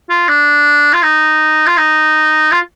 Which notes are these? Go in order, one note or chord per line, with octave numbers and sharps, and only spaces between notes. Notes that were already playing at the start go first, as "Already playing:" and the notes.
F4
D4
F4
D#4
F4
D#4
F4